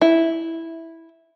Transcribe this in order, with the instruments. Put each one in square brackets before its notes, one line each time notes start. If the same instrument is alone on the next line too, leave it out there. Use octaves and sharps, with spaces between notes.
[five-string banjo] E4